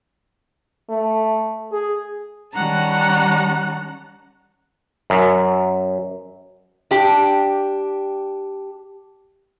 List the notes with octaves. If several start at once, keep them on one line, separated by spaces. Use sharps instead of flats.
A3
G#4
D#3 G3 C#4 F#5 A5 A#5
F#2
D4 G4